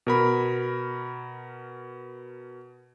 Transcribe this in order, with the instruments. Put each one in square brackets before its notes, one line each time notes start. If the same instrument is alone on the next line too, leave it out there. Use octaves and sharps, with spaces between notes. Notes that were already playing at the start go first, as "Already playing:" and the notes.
[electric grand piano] B2 A#4 B5